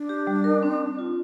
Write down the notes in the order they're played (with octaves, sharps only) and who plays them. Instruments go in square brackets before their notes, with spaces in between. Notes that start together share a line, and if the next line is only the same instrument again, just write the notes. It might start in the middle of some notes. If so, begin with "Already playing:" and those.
Already playing: [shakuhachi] D4
[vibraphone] G4
G3
A#4
C4
C4
F4